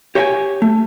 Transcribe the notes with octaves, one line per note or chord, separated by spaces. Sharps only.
G4 C#5 D#5 E5 G5 G#5
A3